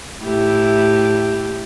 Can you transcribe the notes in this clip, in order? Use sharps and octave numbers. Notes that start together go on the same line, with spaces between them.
A2 E4 G4